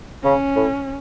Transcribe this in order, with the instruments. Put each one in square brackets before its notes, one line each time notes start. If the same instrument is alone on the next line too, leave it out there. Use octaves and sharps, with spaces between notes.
[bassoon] C#3 [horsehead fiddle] C#4
[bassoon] A2